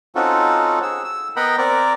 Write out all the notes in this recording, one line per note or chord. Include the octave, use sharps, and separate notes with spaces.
C4 C#4 D#4 F4 F#4 A4
G#4 E6
E6
B3 A#4 D#5 F#5 G5 B5
C4 A#4 D5